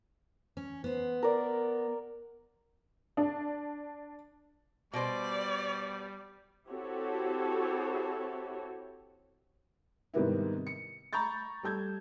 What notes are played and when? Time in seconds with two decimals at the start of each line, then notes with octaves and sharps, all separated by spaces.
0.57 C#4
0.84 B3 C5
1.23 A#4 D5
3.17 D4
4.93 B2 G3 C5 D5
6.68 C4 E4 F#4 G4 A4 C#5
10.14 G#2 C3 D#3 G3 B3 E4
10.67 C#7
11.13 A#5 B5 C#6 G6 A6
11.63 G3 A4 G6 G#6